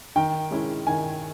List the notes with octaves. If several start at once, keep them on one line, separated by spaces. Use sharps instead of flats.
D#3 G5
G#3 C#4 E4
D#3 G#5